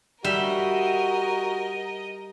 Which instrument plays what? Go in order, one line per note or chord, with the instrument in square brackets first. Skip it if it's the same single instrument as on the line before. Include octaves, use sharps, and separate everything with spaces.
[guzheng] G3 E5 [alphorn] F#4 [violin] A#4 D#5